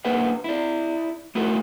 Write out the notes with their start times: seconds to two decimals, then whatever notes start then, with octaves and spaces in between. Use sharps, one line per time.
0.05 A#3 D4 G4 B4 E5 F#5
0.44 E4 D5
1.35 A3 E4 F#4 A4 A#4